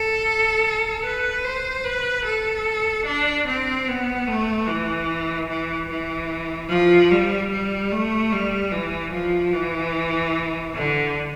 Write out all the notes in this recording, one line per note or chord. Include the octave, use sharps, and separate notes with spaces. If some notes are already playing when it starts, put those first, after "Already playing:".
Already playing: A4
B4
C5
B4
A4
D4
C4
B3
A3
E3
E3
E3
F3
G3
G3
A3
G3
E3
F3
E3
D3